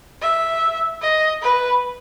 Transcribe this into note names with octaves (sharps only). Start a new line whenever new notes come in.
E5
D#5
B4